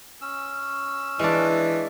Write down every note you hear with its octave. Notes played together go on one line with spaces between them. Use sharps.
C#4 E6
E3 G#3 D4